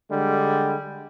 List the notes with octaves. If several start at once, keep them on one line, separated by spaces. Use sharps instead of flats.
D3 G3 G#3